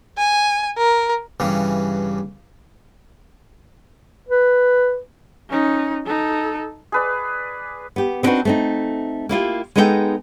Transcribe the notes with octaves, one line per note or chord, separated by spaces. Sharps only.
G#5
A#4
G2 C#3 E3
B4
C#4 D#4
D#4 A4
G#4 B4 D5
B3 G4
B3 C4 D4 D#4 F#4 B4
A3 C4 D#4
A#3 E4 F4 G4
G#3 B3 D#4 E4 A4 G5